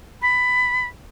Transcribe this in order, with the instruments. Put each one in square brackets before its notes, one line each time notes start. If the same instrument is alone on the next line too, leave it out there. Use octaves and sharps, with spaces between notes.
[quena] B5